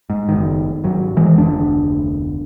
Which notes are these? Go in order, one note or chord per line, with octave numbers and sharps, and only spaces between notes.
G#2
F#1 D#3
G#1 F#3
D#3 E3 G#3
F1 D2 D4